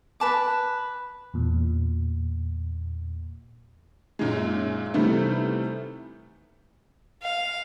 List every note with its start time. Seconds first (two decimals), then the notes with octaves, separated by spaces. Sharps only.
0.20 B4 A5 D6
1.34 E2 A#2
4.19 F#2 A#2 D#3 G#3
4.94 C3 D#3 E3 G3 A3 B3
7.23 F5